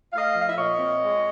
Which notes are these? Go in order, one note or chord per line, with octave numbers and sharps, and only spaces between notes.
A3 D#5 F5
F3
F5
E5
A#2 C#5 D#5
C4
G#3